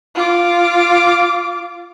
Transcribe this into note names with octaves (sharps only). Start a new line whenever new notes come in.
F4 D6